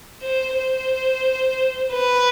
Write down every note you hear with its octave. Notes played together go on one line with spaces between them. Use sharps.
C5
C5
B4